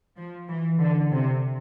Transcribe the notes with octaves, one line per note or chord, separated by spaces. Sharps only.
F3
E3
D3
C3